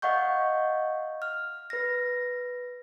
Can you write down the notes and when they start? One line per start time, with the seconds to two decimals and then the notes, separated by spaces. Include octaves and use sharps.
0.02 D#5 F5 F#5 C#6 G6
1.22 F6
1.70 B4 A#6